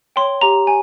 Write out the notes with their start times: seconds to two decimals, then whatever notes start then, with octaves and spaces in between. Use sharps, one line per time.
0.16 C#5 G5 C6
0.41 G4 A#5
0.67 G#5